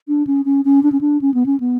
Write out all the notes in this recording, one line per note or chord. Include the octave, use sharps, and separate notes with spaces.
D4
C#4
C#4
C#4
D4
C#4
D4
C#4
B3
C#4
B3